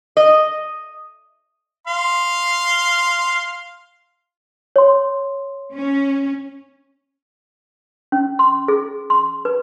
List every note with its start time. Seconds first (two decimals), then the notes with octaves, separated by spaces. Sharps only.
0.17 D#5
1.87 F5 C6
4.76 C#5 C6
5.75 C#4
8.12 C#4
8.39 C6
8.68 G#4
9.10 C6
9.45 B4